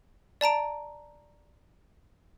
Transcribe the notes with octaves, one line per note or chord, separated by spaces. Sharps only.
D5 A5 A#5 D7